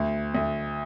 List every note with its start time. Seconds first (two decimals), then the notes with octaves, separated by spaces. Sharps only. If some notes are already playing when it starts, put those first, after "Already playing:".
Already playing: D2
0.35 D2